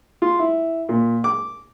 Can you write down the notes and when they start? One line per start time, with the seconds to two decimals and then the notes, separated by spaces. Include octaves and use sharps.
0.22 F4
0.39 E4
0.89 A#2
1.24 D6